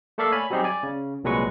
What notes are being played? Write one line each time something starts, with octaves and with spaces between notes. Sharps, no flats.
A3 A#3 A4 D5 E5 F5
C#5 G#5 B5
F#3 G3 C4 D#4 G4 G#4
D5 G#5
C#3
C2 A#2 F#3 G#3 B4 C#6